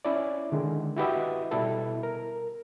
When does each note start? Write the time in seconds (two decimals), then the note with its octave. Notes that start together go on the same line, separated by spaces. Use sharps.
0.05 C#4 E4 D5
0.52 D3 D#3 G#3
0.97 E4 F#4 G4 B4 D#5 E5
1.51 B2 G3 E4 A4
2.03 A#4